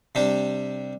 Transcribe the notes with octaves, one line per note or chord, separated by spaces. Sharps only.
C3 G3 D4 G4